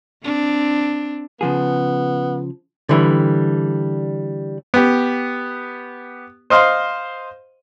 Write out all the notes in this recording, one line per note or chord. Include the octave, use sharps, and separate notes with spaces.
C4 D4
C#3 F3 B3 G#4
D3 E3 G3
B3 G4
C5 D#5 F5 C6